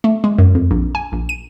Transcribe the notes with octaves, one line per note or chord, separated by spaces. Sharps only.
A3
G#3
F#2
F2
A#1
G#5
A#1
D#7